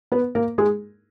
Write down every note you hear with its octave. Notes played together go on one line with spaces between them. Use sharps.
B3 B4
A#3 A#4
G#3 G#4